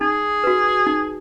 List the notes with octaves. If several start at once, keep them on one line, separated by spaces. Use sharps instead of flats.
D#4 G#4
F#4 B4
D#4